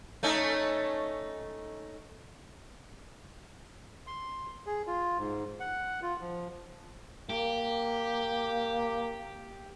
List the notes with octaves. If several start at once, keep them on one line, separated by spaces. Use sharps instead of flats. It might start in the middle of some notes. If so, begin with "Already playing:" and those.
A3 C#4 D#4
C6
G#4
F4
G#2
F#5
F4
F3
A#3 G4